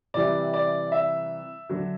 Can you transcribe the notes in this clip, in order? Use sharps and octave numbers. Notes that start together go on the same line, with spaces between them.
C3 E3 G3 D5
D5
E5
D3 F#3